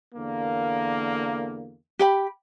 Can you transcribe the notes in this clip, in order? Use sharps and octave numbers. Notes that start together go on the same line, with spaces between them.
E2 D3 A#3
G4 G5 B5